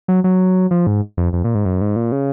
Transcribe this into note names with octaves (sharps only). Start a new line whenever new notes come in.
F#3
F#3
F3
G#2
F2
F2
A#2
G#2
F#2
G#2
A#2
C#3